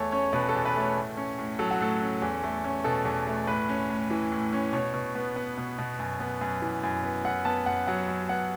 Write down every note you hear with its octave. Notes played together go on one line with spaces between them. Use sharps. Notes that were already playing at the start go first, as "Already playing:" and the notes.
Already playing: E2 A3 A4 C#5
C#4 C#5
B2 B4
A4
E2
B4
A3 C#5
A2
C#4
A2
F#3 A4
F#4
A2 A4
C#4
E2
A3
C#4
B2 A4
E2
A3
A2 B4
C#4
A2
E3
A2
C#4
B2 C#5
B2
B3
B3
B2
B2
F#2
B3
F#2
E3
F#2
B3
F#2 F#5
B3 A5
F#2 F#5
F#3 F#5
F#2
B3 F#5